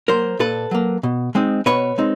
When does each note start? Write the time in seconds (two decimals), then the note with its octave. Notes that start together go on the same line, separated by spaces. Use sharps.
0.08 F#3 A#3 A#4 C5
0.39 A#2 A4 B4
0.71 F#3 A#3
1.03 B2
1.35 G#3 C4 D#4
1.66 B2 B4 C#5
1.98 G#3 C4 D#4